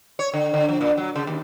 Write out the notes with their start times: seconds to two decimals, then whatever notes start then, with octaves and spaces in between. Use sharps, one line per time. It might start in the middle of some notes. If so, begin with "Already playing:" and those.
0.19 C#5
0.34 D3
0.54 D3
0.69 F3
0.81 A#2
0.97 F#3
1.16 C#3
1.27 D#2